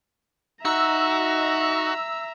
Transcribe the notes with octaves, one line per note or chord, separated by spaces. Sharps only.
D#4 F#4 E5 A#5 E6